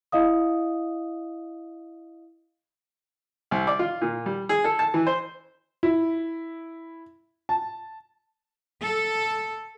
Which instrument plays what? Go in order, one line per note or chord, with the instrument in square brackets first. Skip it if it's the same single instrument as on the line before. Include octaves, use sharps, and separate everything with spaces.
[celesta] E4 D#5 F5 D#6
[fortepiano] C2
D5
F4
A#2
G3
G#4
A4
A5
E3
C5
[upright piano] E4
A5
[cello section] A4